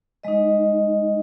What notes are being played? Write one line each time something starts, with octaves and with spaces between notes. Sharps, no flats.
G#3 D#4 D#5